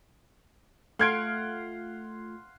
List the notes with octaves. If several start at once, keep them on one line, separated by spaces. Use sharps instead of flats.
A3 F4 F5 F#5 C6 F6 G#6 D7